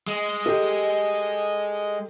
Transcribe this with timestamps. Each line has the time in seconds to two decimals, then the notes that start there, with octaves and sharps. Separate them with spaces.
0.07 G#3
0.46 G4 A4